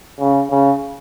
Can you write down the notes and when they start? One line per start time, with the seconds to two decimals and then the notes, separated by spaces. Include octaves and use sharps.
0.20 C#3
0.50 C#3